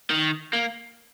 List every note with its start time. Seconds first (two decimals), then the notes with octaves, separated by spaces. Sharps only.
0.10 D#3
0.53 A#3